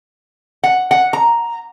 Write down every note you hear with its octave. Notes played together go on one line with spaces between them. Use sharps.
F#5
F#5
A#5